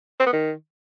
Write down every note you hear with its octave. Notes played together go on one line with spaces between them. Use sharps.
C4
B3
D#3